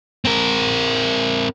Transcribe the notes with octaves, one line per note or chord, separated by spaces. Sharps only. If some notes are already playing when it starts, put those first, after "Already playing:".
C4 A#4